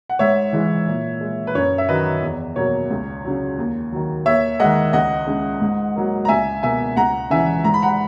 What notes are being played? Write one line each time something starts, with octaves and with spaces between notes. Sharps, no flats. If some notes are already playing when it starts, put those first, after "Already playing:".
F#5
G#2 C#5 E5
E3 G#3
A#2
G#3
B4
F#2 C#5
E5
D#3 F#3 B4 D#5
E2
B2 F#3 A#3 C#5
C#2
C#3 F#3
D#2
D#3 F#3
D#2 C#5 E5
D#3 G#3 D#5 F#5
C#2 D#5 F#5
C#3 G#3
G#2
F#3 A#3
A#5
C#2 E5 G#5
B2 A#3 E5 G#5
C#2 F#5 A#5
C#3 E3 E5 G#5
G#2 A#5
B5
F#5 A#5